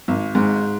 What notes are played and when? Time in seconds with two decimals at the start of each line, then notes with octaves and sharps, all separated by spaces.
0.08 G#1
0.35 G#2